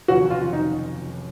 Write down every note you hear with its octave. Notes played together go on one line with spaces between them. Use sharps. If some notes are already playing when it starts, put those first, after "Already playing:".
F1 D#2 C#3 F#3 C#4 F#4
F4
D#4